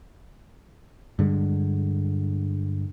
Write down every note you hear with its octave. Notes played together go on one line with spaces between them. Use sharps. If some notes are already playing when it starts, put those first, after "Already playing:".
G2 D3 G#3